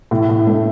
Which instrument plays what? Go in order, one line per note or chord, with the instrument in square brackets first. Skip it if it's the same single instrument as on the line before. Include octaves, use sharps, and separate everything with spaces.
[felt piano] A2
A2
A3